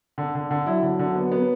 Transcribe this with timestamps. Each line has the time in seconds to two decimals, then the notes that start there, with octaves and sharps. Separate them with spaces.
0.18 D3
0.35 D3
0.51 D3
0.66 F#3 E4
0.83 D3
0.99 D3
1.15 B3
1.32 B3